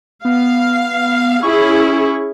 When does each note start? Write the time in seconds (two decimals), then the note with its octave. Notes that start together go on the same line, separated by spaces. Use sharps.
0.25 B3 F5
1.43 C#4 E4 G#4 C#6